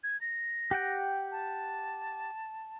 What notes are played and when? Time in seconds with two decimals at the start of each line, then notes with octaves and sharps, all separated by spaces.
0.04 G#6
0.21 A#6
0.71 G4 F#5 G5
1.32 A5